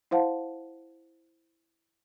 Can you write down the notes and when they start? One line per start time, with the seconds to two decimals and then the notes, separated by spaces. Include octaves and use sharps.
0.11 E4 C5 F5 F#5 A5